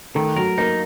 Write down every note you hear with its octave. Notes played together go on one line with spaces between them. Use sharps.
D#3 A3
F#3 A#4
A#3 D#4